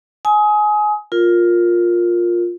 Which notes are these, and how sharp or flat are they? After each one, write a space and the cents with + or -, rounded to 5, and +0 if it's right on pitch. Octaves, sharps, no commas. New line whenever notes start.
G#5 +20 D#6 +25
F4 +10 A#4 +0